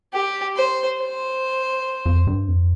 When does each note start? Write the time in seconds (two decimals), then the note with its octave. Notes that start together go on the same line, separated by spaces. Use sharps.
0.13 G4
0.56 C5
0.98 C5
2.06 F2
2.27 G2
2.48 F2